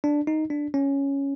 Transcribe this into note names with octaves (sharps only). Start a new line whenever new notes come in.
D4
D#4
D4
C#4